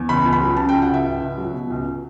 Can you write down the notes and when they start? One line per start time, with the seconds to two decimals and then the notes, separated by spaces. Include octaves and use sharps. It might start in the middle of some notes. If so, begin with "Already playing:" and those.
Already playing: E2
0.09 C#2 B5
0.25 C#2
0.32 B5
0.41 F#3
0.57 C#3 A5
0.69 G5
0.73 C#2
0.82 F#5
0.89 C#2
0.94 E5
1.05 C#2
1.21 C#2
1.38 F#3
1.53 B2
1.70 C#2